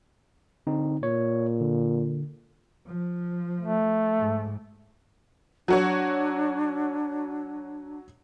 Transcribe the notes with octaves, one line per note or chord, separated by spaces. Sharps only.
D3 C4 D#4
A#2 C#5
D3
F3
A3
G#2
F#3 D4 F#4 C#5